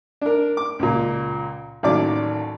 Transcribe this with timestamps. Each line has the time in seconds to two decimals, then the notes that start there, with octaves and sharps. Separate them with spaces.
0.21 D4 A#4
0.57 D6
0.79 C#2 A#2
1.83 A1 D#2 F#3 D5 D6